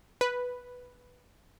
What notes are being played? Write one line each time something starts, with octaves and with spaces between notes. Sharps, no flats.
B4